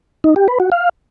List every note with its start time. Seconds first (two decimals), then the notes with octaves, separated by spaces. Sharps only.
0.24 D#4
0.36 G4
0.48 B4
0.60 F#4
0.72 F5